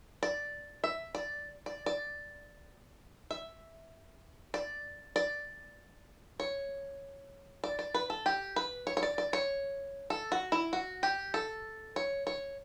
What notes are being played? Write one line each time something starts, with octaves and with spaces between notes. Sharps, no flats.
D5
E5
D5
D5
D5
E5
D5
D5
C#5
D5
D5
B4
A4
G4
B4
C#5
C#5
D5
D5
C#5
A4
F#4
E4
F#4
G4
A4
C#5
C#5